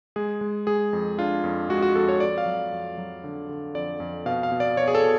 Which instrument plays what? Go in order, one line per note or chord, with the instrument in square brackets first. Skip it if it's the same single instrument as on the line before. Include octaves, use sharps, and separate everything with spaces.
[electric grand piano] G#3 G#4
G#3
G#3 G#4
F2
D4 F4
F2
G#3 F#4
F#4
F2 A4
C#5
F2 D5
F5
F#3
F2
F#3
D3
D3
F2 D5
F2
B2 F5
F5
B2
D5
B2 C#5
G#4
A4
B2